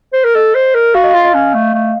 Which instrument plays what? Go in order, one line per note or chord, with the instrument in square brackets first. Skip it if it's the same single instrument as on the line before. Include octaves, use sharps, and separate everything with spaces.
[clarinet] C5
A#4
[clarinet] A4 [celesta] D#5
[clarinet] C5
A#4
[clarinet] F#4 [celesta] F5
[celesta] D#5
[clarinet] F4 [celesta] F5
[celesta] D#5
[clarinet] C#4
A3
A3